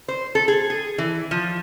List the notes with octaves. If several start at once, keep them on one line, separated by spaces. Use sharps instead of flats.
C5
A4
G#4
G#4
E3
F3